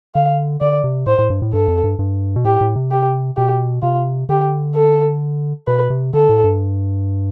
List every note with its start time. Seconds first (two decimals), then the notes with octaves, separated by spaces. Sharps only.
0.15 D3 F5
0.61 D3 D5
0.84 C3
1.06 A2 C5
1.19 A2
1.30 G2
1.42 A2
1.53 G2 A4
1.68 F2
1.84 G2
1.99 G2
2.36 B2
2.45 A2 G4
2.61 A2
2.76 C3
2.91 G4
3.37 B2 G4
3.83 C3 F4
4.29 D3 G4
4.75 A4
5.67 B2 B4
5.90 C3
6.14 D3 A4
6.29 A2
6.44 G2